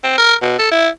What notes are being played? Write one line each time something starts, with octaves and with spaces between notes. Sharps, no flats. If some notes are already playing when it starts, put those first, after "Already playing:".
C4
A#4
B2
A4
E4